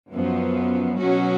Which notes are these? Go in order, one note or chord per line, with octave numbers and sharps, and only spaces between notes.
F#2 F3 B3
B2 F#3 C#4 F#4